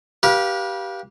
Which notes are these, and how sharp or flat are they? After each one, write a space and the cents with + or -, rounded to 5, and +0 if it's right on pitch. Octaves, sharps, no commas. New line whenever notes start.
G4 -10 B4 -35 F5 +0